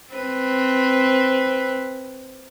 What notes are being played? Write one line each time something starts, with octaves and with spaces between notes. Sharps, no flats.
C4 B4